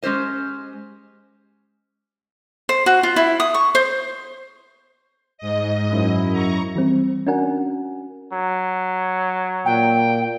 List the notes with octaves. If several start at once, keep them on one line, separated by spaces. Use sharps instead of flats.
G#3 C#4 G4 C5 D#5
C5
F#4
F4
E4
D#6
C#6
C5
G#2 D#5
F#2 F#3 E4
A#5 C#6
E3 G3 C4
C#4 D4 F#4 A#4 F#5 G#5
F#3
A#2 G5